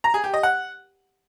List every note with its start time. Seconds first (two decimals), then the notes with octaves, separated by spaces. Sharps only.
0.04 A#5
0.14 G#4
0.24 G4
0.34 D#5
0.43 F#5